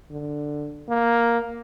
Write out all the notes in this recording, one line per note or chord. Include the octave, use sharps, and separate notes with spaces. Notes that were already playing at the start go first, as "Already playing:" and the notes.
D3
A#3